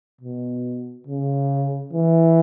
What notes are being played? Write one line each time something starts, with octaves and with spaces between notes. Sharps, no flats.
B2
C#3
E3